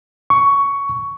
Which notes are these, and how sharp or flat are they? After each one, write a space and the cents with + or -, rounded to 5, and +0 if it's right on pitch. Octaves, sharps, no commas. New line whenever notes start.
C#6 +10